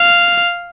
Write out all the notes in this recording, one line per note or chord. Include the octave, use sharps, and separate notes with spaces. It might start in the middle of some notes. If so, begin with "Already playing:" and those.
Already playing: F5